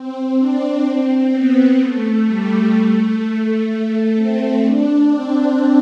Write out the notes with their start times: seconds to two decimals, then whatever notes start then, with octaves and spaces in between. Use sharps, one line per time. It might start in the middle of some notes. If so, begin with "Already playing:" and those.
Already playing: C4
0.38 D4
0.86 C4
1.32 B3
1.80 A3
2.27 G3
2.74 A3
3.22 A3
4.16 C4
4.64 D4
5.10 C4